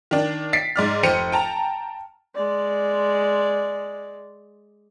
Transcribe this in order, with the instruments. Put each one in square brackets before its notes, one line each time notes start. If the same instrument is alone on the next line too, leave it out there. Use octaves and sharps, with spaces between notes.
[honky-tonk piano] D#3 D4
A6 B6 C7 D7
G#2 D5 F6
F1 C5 C#7 D#7
G5 A5 A#5
[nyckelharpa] G#3 D5